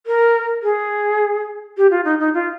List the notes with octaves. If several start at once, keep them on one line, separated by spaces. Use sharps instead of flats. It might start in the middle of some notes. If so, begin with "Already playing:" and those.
A#4
G#4
G4
F4
D#4
D#4
F4